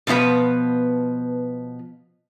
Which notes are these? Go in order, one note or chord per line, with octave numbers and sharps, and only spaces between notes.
B2 D3 F3 B3 B4